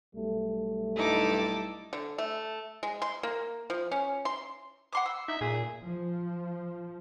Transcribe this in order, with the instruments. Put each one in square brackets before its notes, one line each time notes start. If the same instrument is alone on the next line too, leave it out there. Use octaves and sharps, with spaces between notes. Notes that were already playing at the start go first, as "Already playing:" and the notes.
[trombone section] B1 G3 A3
[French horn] G2 [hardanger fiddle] D#4 A4 [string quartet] E4 A5 D6
[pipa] D3
A3
G#3
C6
A#3
F3
C#4
C6
[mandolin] F#5 C6 D6
E6
[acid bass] D#4 [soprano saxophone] E5
[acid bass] A#2 [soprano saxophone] G#4
[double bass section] F3